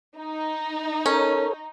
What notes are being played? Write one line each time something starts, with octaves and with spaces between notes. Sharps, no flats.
D#4
C#4 A4 A#4 C#5